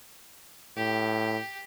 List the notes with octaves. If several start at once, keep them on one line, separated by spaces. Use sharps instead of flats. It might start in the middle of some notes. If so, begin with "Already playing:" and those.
A2 G4